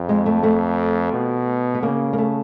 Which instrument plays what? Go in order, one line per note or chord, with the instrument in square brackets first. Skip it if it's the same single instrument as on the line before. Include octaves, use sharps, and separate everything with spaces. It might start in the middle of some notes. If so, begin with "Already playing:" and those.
Already playing: [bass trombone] F2
[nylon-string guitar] G#3
A3
A3
[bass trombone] B2
[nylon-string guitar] B3
[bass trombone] C#3 [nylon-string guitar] A#3
[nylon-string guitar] A#3
A3